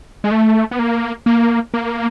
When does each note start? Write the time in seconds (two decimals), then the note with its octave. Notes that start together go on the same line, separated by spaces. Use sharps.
0.24 G#3
0.31 A3
0.71 B3
0.79 A#3
1.26 A#3
1.74 A#3